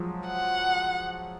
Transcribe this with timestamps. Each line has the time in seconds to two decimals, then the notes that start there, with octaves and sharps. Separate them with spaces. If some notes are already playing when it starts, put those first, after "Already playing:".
Already playing: F3 F#3 G#3
0.27 F#5